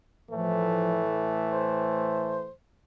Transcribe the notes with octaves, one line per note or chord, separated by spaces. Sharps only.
A2 E3 F3 A3
C5